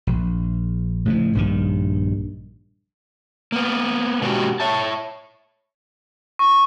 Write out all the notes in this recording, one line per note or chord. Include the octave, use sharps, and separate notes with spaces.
A#1
A2 C#3 F3
A#1 G2 D#3
A#3 B3
B2 G#3 A#3 C#4 F#4 G4
C#5 E5 A5
C#6